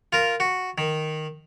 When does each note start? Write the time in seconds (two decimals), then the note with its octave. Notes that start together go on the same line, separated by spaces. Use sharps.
0.13 F4 A#4
0.40 F#4
0.78 D#3